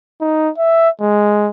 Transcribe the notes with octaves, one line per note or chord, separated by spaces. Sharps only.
D#4
E5
G#3